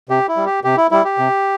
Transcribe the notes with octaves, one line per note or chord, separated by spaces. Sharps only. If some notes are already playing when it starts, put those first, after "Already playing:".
C3 G4
E4
G3
G4
C3 G4
E4
G3 E4
G4
C3